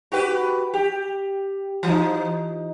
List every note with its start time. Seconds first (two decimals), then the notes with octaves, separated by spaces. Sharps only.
0.12 F#4 G4 B4
0.74 G4
1.83 E3 D#4